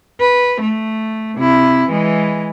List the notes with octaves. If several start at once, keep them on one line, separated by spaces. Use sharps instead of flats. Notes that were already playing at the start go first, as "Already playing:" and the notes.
B4
A3
C3 E4
E3 G#3